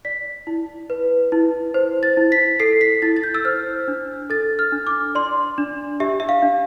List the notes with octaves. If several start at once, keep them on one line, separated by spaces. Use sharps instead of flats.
D5 B6
E4
B4
E4
C5
A6
E4
B6
A4 C7
B6
E4 A6
A6
G6
E6
C5 F6
D4
A4 A6
F6
D4
D6
D5 C6
D4
G4 E5
E5
F5
D4